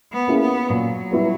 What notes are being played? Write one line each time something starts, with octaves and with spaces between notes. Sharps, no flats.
B3
A#3 C#4 E4 G#4
B3
A#2 F#3
G3 B3 E4 G4